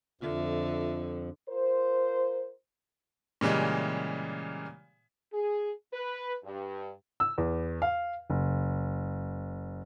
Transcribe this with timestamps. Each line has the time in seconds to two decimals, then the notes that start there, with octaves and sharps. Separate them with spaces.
0.21 F2 D3 F4 E5
1.49 F4 A#4 C5
3.41 A#2 C#3 E3 G3 G#3
5.34 G#4
5.93 B4
6.44 G2
7.20 E6
7.38 E2
7.82 F5
8.30 F#1